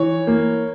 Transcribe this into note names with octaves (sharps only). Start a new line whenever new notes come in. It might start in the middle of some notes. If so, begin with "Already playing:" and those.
Already playing: E3 C#5
A#3